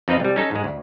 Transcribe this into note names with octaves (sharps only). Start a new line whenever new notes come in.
F2 C4 D#4 B4 D#5 F5
C2 G3
C#4 D#4 A4
G#2 G#3
D2